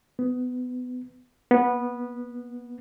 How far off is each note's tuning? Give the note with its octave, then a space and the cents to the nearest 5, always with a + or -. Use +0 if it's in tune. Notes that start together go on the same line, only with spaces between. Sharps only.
B3 +20
B3 -15